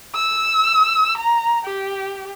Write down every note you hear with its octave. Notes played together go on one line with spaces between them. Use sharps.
E6
A#5
G4